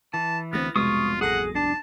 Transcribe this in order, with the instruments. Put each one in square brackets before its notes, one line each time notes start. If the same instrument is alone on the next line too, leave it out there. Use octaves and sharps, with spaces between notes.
[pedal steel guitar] E3 [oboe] A5
[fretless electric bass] D2 G#3 C4 [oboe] B3 [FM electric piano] F6 A6 A#6
[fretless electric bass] F1 C2 B2 [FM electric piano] G#3 [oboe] F4 [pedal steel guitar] C#6 D#6
[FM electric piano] A1 A4 A#6 [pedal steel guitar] G#4 [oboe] F#5
[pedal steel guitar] D4 [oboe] A5